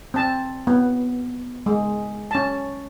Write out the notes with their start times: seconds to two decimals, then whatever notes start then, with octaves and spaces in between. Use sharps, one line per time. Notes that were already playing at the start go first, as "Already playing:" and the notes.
0.14 C4 A5
0.67 B3
1.66 G#3
2.31 C#4 A5